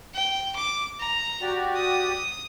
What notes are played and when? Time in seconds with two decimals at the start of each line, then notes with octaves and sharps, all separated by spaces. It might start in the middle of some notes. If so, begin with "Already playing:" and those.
0.14 G5
0.56 D6
0.99 A#5
1.41 F#4 G4 D5
1.76 D#6